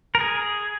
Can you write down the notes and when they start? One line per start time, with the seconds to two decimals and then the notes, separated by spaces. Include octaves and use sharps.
0.15 A#4
0.20 G#4